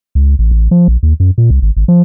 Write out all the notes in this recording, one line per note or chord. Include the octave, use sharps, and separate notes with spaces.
C#2
A1
A1
F3
A#1
D#2
F#2
A#2
C2
G#1
G#1
F3